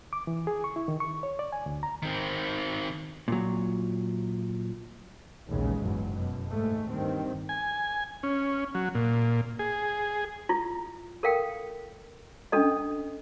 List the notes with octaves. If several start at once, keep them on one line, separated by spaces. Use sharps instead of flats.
D6
E3
G#4
C#6
E4
D#3
C#6
C#5
D5
G#5
D2
A#5
D#3 C4
A#2 F#3
A#1 D#2 C#3 E3 G#3
F#1 E2 G#2 F#3
F#2 B2
D#2 G#2 G#3 A3
G2 D#3 C4
G#5
C#4
F#3
A#2
G#4
E4 F4
A4 A#4 F5 G5
C#4 D4 A4 D#5